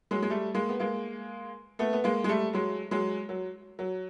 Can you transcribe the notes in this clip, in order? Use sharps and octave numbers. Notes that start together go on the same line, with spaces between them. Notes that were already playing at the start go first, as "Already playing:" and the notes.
F#3 G#3
G#3
G3 A3
G#3 A#3
B3
G#3 A#3
A3 B3
B3
G#3 A#3
G#3
G3 A3
F#3 G#3
F#3 G#3
F#3
F#3